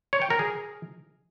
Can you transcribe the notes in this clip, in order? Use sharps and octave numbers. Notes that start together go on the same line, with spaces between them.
C#5
G5
A#4
G#4